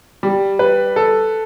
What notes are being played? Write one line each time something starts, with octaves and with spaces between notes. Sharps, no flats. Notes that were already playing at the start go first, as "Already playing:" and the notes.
G3
B4
A4